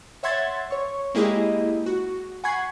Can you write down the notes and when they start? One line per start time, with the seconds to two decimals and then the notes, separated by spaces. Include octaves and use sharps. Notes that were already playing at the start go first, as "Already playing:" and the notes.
0.23 C#5 E5 F#5 C6 G#6 A6
0.71 C#5 C#6
1.14 G#3 A#3 E4 G4 G#4 D#5
1.86 F#4
2.44 F#5 G#5 B5 C#6 G#6 C7